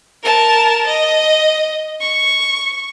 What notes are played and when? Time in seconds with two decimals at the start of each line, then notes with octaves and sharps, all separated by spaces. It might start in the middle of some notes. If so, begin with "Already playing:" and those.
0.23 A#4 A5
0.87 D#5
2.01 C#6